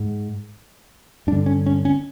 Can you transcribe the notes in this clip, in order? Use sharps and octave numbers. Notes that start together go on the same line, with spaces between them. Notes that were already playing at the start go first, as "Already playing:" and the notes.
Already playing: G#2
G2 D4
D3
C#4
C#4
C#4